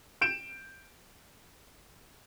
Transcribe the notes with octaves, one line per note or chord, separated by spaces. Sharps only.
G6 D7 E7